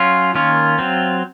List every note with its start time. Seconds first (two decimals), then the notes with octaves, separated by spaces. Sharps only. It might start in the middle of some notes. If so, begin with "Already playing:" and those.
Already playing: F#3 C#4 F4
0.35 D#3 A#3 C#4 F4
0.79 F#3 C4